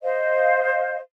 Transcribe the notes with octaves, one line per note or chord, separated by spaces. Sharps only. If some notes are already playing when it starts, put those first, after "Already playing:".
C5 D#5 F5